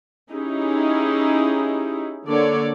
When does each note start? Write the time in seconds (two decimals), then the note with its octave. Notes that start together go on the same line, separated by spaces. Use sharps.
0.31 C#4 D#4 E4 G4 G#4
2.29 D3 A#3 A4 C#5 D5